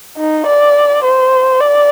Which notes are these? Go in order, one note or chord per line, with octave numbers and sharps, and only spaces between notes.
D#4
D5
C5
D5